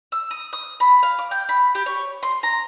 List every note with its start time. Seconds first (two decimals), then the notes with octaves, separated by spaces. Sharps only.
0.12 E6
0.31 D#6
0.53 D#6
0.80 B5
1.03 F5
1.18 D6
1.31 G5
1.49 B5
1.75 G4
1.86 C#5
2.23 C6
2.43 A#5